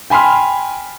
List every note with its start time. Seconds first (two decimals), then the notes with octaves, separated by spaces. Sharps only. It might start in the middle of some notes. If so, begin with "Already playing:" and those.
0.10 G5 G#5 B5 C6 F6